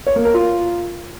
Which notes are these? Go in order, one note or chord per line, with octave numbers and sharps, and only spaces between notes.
C#5
A#3
A#4
F4